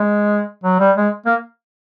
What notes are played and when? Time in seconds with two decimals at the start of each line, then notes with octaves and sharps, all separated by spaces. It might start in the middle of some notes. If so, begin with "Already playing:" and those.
Already playing: G#3
0.64 F#3
0.80 G3
0.97 G#3
1.26 A#3